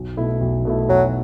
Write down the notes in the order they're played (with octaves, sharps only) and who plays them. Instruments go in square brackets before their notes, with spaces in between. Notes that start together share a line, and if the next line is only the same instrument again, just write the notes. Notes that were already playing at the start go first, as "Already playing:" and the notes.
Already playing: [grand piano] B1
B2 A3 E4
B1
B2 A3 E4
[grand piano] B1 [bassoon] F#3